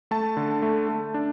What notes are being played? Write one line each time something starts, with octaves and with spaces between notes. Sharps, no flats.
A3 A5
D3
A3
A3
D4